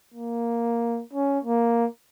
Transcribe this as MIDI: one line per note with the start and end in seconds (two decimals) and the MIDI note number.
0.14 1.02 58
1.13 1.39 61
1.44 1.86 58